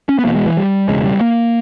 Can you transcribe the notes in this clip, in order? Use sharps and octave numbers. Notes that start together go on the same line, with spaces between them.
C#4
B3
E1 E2 B2 A#3
G#3
E3
G3
E1 D#2 C#3 G#3
G3
A#3